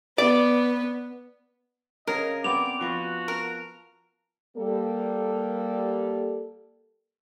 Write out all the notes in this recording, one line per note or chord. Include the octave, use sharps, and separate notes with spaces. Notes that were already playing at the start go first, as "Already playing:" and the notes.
B3 D5
C#3 G#4 A#4 D#5
B3 C4 D5 D6 F7
F3 F#4 B4
A#4
G3 A#3 A4